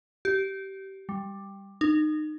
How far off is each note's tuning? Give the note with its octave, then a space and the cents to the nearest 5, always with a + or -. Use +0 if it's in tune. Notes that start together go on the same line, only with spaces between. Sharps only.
G4 -20
G3 +10
D#4 -25